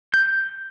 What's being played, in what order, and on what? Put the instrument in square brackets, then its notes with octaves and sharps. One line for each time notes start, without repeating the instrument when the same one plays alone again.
[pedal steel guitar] G6